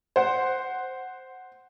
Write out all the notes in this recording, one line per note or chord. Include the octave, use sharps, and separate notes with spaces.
C5 F#5